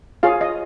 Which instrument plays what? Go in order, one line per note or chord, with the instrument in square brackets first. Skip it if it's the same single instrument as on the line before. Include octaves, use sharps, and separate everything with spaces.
[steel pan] F4 G#4 C#5 F5
D#5